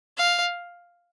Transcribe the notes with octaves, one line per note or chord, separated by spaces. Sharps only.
F5